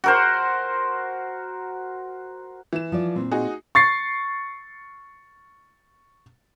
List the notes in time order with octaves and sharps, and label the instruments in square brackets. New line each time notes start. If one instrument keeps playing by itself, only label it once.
[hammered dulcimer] F#4 A#4 C5
[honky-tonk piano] E3 E7
[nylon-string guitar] F3 D5
A#2 C4
[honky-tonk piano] D#4 F#4 G#4
[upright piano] C#6 A6 C7